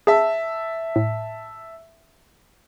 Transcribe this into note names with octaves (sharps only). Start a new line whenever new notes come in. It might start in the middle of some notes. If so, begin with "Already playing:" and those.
G#4 E5 A5
A2